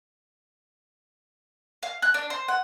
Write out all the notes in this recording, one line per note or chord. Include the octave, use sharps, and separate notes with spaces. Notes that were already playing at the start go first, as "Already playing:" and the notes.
F5
F#6
D4
C5
F#5